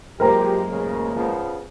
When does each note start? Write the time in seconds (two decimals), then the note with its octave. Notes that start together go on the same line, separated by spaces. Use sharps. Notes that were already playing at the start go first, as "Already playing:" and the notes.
0.20 F#2 F3 G#3 A#3 G4 A#4 C5 A#5
0.71 A1 C#3
1.16 C#3 F3 B3